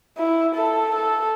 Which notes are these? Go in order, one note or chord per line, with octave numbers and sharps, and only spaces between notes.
E4
A4
A4